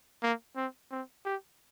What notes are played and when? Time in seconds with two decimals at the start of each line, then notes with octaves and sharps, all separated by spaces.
0.23 A#3
0.56 C4
0.91 C4
1.25 G4